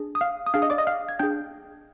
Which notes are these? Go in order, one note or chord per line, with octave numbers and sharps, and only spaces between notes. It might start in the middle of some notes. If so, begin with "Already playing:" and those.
Already playing: D4 G#4
D#6
F5 F6
D#6
D4 G#4 F5 F6
D#5 D#6
D5 D6
D#5 D#6
F5 F6
G#6
D4 G#4 G5 G6